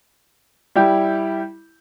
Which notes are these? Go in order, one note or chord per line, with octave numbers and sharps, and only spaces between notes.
G3 E4 G4